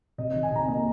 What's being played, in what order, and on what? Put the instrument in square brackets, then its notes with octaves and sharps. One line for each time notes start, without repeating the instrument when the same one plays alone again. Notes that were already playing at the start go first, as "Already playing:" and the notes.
[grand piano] C3 D#5
D#3 D#5
G#5
C3 A#5
A#3 D#5